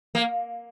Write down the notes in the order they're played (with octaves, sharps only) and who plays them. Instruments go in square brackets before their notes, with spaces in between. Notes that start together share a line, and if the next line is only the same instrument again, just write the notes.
[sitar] A#3